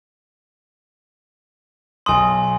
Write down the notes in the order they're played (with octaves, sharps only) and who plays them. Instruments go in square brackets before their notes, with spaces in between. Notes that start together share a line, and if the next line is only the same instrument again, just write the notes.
[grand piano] B1 D#6 [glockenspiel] G#5 C6